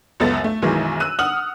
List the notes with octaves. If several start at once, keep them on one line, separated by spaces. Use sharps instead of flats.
C#2 F#2 B3 A4 A6
A3
B1 F#2 D#3 E3 F#3 G#3
E6 F#6 D#7
F#5 D#6 F6 F#7